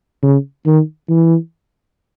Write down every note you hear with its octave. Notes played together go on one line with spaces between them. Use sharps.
C#3
D#3
E3